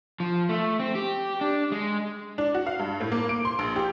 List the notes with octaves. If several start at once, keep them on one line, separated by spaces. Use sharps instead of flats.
F3
A3
C4
G4
D4
G#3
D4
F#4
F5
G2
A2
A#3
D7
C6
A#1
G4